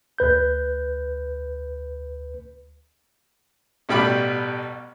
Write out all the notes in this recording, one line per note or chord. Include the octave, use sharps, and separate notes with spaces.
D2 B4 G6
A1 B2 G3 G5 B5 D6